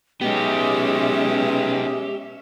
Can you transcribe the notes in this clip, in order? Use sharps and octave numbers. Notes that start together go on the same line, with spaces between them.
B2 G#3 B3 C#4 D#4 G4 E5